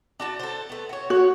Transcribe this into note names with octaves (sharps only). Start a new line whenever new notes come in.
D4 F#4 A5
A4 C5
A3 B3
F#4 C#5
F#4 C#5